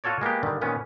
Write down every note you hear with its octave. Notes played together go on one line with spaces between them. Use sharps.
F4 F#4 A4 C#5 D5
G#3 A#3 B3 G4
G2 D3 D#3 G3
A#2 D#3 B3 C#4